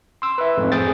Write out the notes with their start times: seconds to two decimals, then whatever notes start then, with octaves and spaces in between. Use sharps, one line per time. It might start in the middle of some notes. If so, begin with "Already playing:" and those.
0.22 C6 E6
0.38 B4 E5
0.57 F2 G#2 A3
0.72 C4 G#4 G5 A6